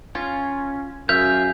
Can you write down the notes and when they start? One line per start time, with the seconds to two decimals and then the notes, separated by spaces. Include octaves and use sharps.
0.15 C#4 F4
1.09 F#2 G#4 E5 F5 G6 F7